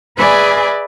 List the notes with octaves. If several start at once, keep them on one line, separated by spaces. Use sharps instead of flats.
G#4 B4 D5 E5 G#5 B5